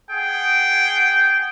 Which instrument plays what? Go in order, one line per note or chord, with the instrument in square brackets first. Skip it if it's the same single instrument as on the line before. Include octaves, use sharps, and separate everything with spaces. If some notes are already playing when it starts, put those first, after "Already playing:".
[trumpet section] G#4 F#5 G5